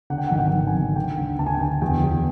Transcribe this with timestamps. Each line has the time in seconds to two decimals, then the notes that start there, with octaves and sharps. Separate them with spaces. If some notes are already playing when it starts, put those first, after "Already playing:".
0.10 D3 F#5
0.18 G5
0.27 F#5
0.31 G#1
0.38 G5
0.53 G#1
0.67 G#5
0.74 G#1
0.96 D3 G5
1.17 D2
1.39 D2 A5
1.47 G#5
1.55 G5
1.60 D2 G#5
1.82 E2 G5
2.04 E2